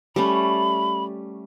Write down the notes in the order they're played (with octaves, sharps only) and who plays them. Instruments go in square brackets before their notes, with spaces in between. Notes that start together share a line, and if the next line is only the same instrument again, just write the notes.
[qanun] G3 A3 C#4 [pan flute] B5